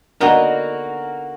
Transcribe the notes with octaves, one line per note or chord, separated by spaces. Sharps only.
D3 A#3 B3 D#4 F#4 A#4